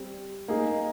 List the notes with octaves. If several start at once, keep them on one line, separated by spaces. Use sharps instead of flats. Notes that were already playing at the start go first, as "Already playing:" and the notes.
Already playing: G3 C4
A#3 D#4 G#4